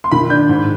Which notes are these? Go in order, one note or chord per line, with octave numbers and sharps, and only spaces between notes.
C6
D#3 B5
D4 G6
G#2